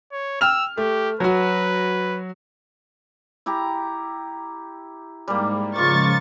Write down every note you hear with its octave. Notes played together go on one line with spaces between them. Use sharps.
C#5
G5 E6 F6 F7
A3 G4
F#3 F#4 B4
E4 G4 A#5
G#2 G3 A#3
C#3 F3 G#3 A#3 F4 C#6 A6